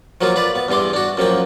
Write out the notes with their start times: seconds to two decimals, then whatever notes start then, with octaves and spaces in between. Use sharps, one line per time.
0.21 F3 F#3 A#3 F4
0.36 F4 B4 D5
0.55 B3
0.68 E2 G2 E3 C6 D6
0.93 D4 F#4
1.17 F#2 F3 A#3 G5